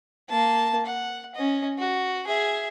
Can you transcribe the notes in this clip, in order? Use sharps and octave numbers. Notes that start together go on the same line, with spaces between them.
A#3 A5
F#5
C#4 D#5
F#4
G#4 E5